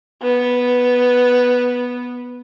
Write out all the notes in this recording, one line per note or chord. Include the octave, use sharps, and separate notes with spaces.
B3